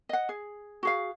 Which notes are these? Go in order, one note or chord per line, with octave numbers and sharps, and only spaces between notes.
D#5 F#5
G#4
F#4 G#4 F5